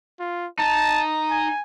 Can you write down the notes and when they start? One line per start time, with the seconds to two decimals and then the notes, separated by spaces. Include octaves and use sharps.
0.20 F4
0.59 D#4 A5
1.30 G#5